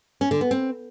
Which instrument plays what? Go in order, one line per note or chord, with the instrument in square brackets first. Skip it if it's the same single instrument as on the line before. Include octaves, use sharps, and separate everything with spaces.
[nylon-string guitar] C#4
D3
B3
C4